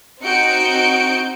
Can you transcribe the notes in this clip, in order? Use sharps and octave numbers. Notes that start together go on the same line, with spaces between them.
C4 D#4 F#4 G6 C#7 D7